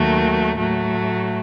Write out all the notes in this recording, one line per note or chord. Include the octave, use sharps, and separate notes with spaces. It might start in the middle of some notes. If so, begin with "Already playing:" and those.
Already playing: D#2 D#3 F#3 A3
A2 F#3 A3